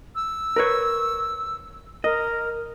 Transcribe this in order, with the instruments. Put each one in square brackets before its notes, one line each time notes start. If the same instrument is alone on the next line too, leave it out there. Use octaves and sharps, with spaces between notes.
[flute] E6
[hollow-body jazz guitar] A#4 B4 C#5
[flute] A#4 [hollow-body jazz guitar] D#5